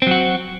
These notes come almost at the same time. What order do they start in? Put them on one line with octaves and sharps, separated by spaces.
C4 F#3 F#4